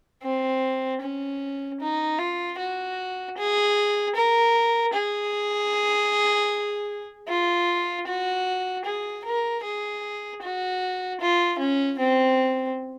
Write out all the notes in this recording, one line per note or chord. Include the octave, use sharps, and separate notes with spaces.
C4
C#4
D#4
F4
F#4
G#4
A#4
G#4
F4
F#4
G#4
A#4
G#4
F#4
F4
C#4
C4